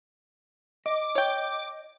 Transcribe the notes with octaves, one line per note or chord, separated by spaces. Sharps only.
D#5 D6
C#5 G5